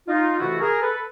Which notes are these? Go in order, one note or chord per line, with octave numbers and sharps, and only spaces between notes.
D#4 F4
F2 C3 E3 A3 E4 F#4
G#4 A#4
A4 B4